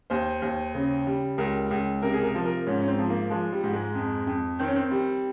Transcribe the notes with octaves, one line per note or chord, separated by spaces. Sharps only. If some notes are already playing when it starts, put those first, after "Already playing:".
D#2 C5
D#2
C#3
G3
C#2 A#4
C#2
C3 A#4
G#4
A#4
F3
A#4
G#2 C#4
C#4
C4
F3
A#3
F3 G#3
G3
G#2
G#3
F2
F2
D#3 C4
C#4
C4
G3